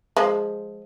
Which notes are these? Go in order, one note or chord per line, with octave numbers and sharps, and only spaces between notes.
F3 G#3